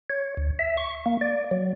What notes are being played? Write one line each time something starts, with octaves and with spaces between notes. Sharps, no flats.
C#5
D2
E5
C#6
A#3
D5
F#3